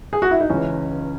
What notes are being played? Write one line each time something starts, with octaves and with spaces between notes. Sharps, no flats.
G#4
F#4
E4
D#4
C#2 C#3 E3 C#4